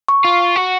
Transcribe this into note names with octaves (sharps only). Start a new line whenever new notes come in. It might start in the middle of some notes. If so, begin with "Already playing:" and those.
C#6
F4
F#4